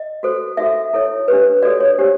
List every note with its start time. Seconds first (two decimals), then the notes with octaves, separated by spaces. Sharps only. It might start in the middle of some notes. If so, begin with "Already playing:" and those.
Already playing: D#5
0.23 F#4 A4 C5
0.57 D#4 F#4 A4 E5
0.93 E4 A4 C#5
1.28 D4 G4 B4
1.62 F#4 A4 C#5 D5
1.80 C#5
1.98 D4 G4 C5